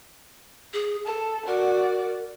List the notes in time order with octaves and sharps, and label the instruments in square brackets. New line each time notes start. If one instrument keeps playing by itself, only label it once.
[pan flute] G#4
[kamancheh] A4 [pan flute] A5
[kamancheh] F#4 D5 [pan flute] A#4